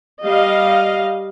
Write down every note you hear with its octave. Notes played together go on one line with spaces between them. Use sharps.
G3 D#5 F5